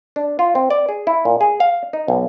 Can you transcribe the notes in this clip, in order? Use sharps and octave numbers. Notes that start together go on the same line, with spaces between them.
D4
F4
C4
D5
G#4
E4
A#2
G#4
F5
D#4
B1